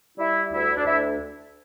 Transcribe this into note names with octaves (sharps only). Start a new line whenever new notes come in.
G3 E4
D2 E4
D4
D2 E4